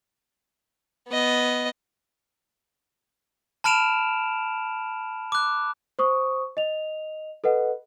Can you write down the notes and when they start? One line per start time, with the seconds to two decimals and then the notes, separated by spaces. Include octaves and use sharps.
1.08 B3 D#5
3.64 A5 B5 F6 D7 E7 F7
5.32 D6 F#6
5.99 C5 C#6 D#6
6.57 D#5 F7
7.44 A4 B4 D#5 F#5